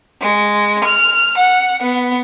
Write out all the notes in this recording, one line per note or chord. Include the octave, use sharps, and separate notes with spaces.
G#3
F6
F#5
B3